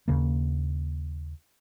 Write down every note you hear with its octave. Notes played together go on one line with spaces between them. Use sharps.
D#2 C#3 A#3